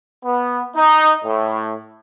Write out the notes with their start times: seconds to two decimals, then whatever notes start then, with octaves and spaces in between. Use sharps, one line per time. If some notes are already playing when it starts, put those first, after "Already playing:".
0.24 B3
0.75 D#4
1.25 A2